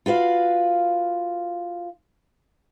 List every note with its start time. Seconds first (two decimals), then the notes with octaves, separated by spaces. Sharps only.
0.06 F4 F#4 B4 F5